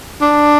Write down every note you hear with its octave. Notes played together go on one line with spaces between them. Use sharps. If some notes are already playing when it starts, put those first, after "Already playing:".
D4